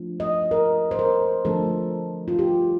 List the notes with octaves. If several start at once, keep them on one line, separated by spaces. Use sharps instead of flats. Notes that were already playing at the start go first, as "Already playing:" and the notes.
Already playing: F3 A3 D4 F4
D#5
A#4
C5
A#4
D3 F3 A3 D4 A4
F4
G4